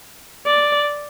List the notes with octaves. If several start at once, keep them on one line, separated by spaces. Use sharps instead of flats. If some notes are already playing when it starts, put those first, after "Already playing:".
D5